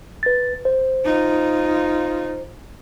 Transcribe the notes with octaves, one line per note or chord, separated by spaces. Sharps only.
B4 A6
C5
D#4 F4